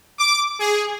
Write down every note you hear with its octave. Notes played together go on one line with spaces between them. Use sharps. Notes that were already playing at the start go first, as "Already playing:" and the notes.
D6
G#4